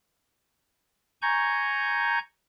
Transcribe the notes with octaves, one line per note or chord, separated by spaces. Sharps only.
G#5 A#5 C#6 G6